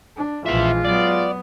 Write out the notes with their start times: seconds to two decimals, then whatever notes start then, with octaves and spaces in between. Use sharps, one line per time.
0.16 D4
0.46 A#1 E3 G#3 F4 E5 G5
0.85 F#3 B3 D5